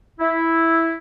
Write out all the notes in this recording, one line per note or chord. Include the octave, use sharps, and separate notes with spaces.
E4